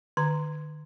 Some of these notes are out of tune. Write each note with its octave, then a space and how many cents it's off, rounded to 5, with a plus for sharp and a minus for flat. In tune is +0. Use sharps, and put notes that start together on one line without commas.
D#3 -45 A#5 -5